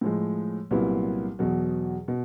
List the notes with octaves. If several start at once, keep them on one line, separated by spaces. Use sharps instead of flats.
A2 F3 G#3
C2 A#2 F#3 B3 E4
E2 B2 F#3
B2